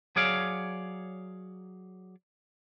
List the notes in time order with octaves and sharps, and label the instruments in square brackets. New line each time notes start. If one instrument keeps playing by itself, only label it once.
[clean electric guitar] F#3 G#4 C#5 D5 F5